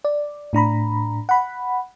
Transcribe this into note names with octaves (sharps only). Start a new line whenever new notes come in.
D5
A2 D4 A#5 B5
F#5 B5